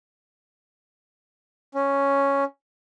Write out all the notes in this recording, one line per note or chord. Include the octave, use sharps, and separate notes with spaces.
C#4